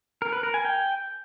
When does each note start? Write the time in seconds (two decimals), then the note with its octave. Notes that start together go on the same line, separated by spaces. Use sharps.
0.22 A#4
0.33 B4
0.43 A#4
0.54 G#5
0.65 G5